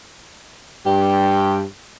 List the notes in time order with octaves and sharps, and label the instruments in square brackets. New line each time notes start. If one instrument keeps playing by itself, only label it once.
[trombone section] G2 [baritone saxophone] G4